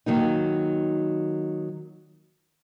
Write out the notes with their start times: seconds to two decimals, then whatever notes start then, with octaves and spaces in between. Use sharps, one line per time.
0.06 D#3 F#3 A#3 D#4